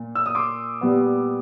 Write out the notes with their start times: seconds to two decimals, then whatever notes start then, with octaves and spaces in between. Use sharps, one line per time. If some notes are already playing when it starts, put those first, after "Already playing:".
Already playing: A#2
0.15 E6
0.26 D#6
0.35 C6 D6
0.81 A#2 G3 B3